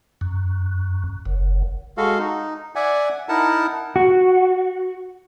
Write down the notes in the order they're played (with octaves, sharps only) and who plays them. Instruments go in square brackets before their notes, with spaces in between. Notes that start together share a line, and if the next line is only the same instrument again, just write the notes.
[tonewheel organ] F#2
F#1
[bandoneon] G#3 F#4 A4 F5
D#4
D5 E5 F#5 G#5
D#4 E4 A#4 F#5 A5
[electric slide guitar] F#4